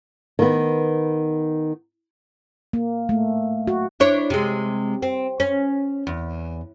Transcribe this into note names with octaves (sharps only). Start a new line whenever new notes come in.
D#3 B3
A#3
A3
F#4
D4 E4 C#5
C3 G#3
C4
C#4
E2